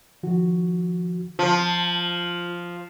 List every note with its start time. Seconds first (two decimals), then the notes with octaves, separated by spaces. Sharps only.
0.23 D#3 F3 F#4
1.39 F3 F4